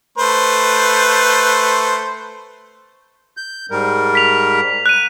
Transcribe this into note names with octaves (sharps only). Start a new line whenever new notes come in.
A3 B4 C5
G6
G#2 G3 A#4
B6 F7
F#6 D#7